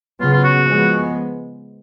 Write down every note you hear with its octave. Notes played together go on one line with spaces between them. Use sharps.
C#3 F#3 B3 F4
F4
F#4
F3 G#3 B3